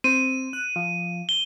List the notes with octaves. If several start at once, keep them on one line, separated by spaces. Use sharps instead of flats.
C4 D#7
F#6
F3
G7